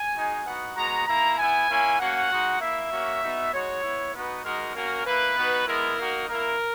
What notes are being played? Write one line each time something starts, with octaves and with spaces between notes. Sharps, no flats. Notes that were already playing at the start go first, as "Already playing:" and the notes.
Already playing: G#5
G#3 D#4 F#4
B3 D#4 F#4 F#5
G#3 B3 F#4 A#5
A#3 E4 A#5
B3 E4 G#5
A#3 C#4 E4
A#3 C#4 F#4 F#5
G#3 D#4 F#4
A#3 E4 E5
A#3 C#4 F#4
B3 D#4 F#4
G#3 D#4 F#4 C#5
B3 E4
B3 D#4 F#4 B4
G#3 D#4 F#4 A#4
A#3 C#4 F#4 A#4
A#3 E4 B4
B3 D#4 F#4
G#3 B3 E4 A#4
A#3 D#4 F#4
A#3 E4 A#4